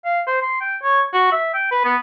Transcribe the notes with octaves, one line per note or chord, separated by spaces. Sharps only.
F5
C5
C6
G5
C#5
F#4
E5
G5
B4
B3